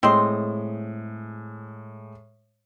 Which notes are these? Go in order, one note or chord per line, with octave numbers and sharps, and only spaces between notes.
A2 G#3 C4 D#5 C6